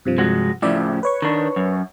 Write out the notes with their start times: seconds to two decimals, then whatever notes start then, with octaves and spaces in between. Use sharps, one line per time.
0.05 G2 C3 F3
0.18 G#3 F#4
0.62 A2 C#3 F3 E4 D5 E5
1.03 B4 C#5 C#6
1.22 D#3 D4
1.56 F#2